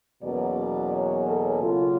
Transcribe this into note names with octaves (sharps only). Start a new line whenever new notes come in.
E2 B2 F#3 A#3 C#4 D5
C#5
A4
C#3 F#3 A#3 F4